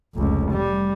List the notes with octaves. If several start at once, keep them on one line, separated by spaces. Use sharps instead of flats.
F1 C#2
G3